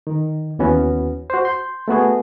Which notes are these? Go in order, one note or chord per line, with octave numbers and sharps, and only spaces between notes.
D#3
D#2 E3 B3 C#4 F#4
F#4 C5
C6 G6
A3 B3 F#4 G#4